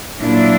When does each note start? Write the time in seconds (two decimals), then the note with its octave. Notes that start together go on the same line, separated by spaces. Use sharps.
0.21 A#2 F#3 A#3 D4 E4